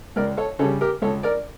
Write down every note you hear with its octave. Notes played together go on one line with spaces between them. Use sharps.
C#2 A#4 D5
A4 C#5
C#3 G3 A4 C#5
G4 A#4
C#2 A4 C#5
A#4 D5